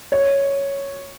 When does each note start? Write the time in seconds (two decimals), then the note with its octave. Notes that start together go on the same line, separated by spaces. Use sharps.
0.12 C#5